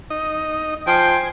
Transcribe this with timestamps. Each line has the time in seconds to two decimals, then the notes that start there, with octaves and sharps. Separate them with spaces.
0.10 D#4 D#5
0.87 F3 C5 G5 G#5